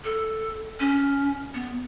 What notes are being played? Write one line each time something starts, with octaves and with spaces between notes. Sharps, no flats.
A4
C#4
B3